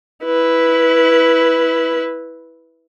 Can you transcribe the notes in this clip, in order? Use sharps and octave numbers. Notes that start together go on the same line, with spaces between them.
E4 B4